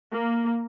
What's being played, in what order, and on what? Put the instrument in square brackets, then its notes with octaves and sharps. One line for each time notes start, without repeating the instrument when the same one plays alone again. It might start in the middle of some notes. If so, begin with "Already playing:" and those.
[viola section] A#3